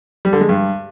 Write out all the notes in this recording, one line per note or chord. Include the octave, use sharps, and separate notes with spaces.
G3
D3
G#3
G2